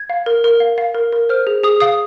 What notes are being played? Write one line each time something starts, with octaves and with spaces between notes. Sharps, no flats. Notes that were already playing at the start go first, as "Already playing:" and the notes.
Already playing: G#6
F5
A#4
A#4
F5
F5
A#4
A#4
C5 F6
G#4
G#4 D#6
F5 D#6